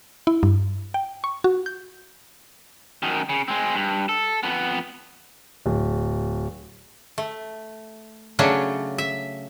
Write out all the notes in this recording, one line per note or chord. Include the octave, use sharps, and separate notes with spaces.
E4
G2
G5
C#6
F#4
G6
F#2 D#3
C#3
G#3 C4
G2
A4
F2 B3
D1
A3
C#3 F#3 A3 C#4 D4
E5